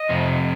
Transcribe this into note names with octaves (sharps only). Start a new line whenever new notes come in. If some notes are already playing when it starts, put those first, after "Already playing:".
Already playing: D#5
F2 C3